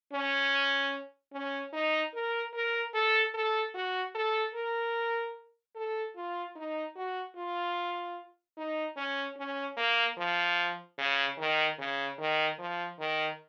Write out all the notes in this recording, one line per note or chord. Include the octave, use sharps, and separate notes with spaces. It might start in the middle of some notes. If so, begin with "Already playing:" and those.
C#4
C#4
D#4
A#4
A#4
A4
A4
F#4
A4
A#4
A4
F4
D#4
F#4
F4
D#4
C#4
C#4
A#3
F3
C#3
D#3
C#3
D#3
F3
D#3